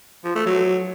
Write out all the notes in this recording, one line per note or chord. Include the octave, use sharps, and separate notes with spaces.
F3
A3
F#3